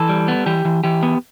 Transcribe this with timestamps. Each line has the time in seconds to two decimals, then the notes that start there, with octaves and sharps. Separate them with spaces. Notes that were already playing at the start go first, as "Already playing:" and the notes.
Already playing: E3 A4
0.09 G3
0.28 B3
0.46 E3 G4
0.65 E3
0.84 E3 G4
1.03 B3